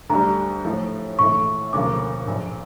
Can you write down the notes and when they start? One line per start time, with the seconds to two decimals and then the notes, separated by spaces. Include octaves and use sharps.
0.10 D2 D3 G3 A#5
0.65 A2 F3 A3
1.19 A#1 A2 E3 A3 C#6
1.73 E1 D2 C#3 F3 A#3 D6
2.27 A#1 A#2 F3